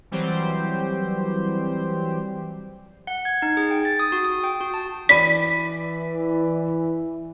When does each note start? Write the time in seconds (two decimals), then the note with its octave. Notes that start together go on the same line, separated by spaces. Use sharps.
0.11 E3 F#3 G3 C4 G4 C5
3.07 F#5
3.25 G#6
3.42 D#4
3.57 G#4
3.71 G5
3.85 A6
3.99 D#6
4.12 F#4
4.25 D#6
4.44 G5
4.61 F#4
4.74 A5
5.09 E3 D5 B5 B6 D#7